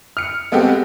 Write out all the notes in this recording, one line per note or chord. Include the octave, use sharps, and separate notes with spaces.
F6 C#7
G#3 B3 C4 F#4 G4 A4